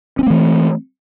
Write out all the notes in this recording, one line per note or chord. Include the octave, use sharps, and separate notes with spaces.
E3 A3 C4 C#4